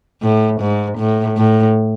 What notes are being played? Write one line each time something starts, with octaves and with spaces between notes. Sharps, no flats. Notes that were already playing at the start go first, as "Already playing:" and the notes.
A2
G#2
A2
A2